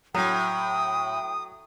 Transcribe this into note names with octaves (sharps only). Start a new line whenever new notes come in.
A2 F#3 G5 D#6